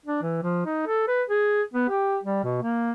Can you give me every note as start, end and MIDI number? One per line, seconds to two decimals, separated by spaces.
0.06 0.22 62
0.22 0.40 52
0.43 0.65 53
0.66 0.86 63
0.87 1.03 69
1.08 1.23 71
1.30 1.62 68
1.74 1.87 59
1.89 2.18 67
2.23 2.42 55
2.44 2.58 47
2.62 2.92 58